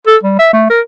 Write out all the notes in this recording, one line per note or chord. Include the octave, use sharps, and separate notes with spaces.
A4
G3
E5
A3
A#4